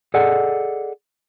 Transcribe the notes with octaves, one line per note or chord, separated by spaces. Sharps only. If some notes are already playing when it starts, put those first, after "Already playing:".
G#4 A4 D5 D#5 F#5